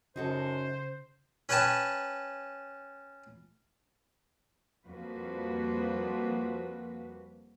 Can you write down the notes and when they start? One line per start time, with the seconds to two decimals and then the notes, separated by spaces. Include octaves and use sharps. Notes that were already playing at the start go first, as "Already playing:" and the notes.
0.16 F#2 C#3 D#4 F#4 A4 C5
1.49 C#4 B4 C#5 G5 A5
4.85 F2 F3 G3 A#3 F#4 B4